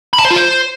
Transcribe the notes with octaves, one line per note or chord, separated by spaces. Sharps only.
B5
A5
C5
F4
C5